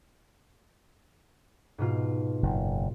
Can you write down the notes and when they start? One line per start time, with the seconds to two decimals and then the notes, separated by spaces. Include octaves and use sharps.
1.78 G#2 B2 F4
2.43 F#1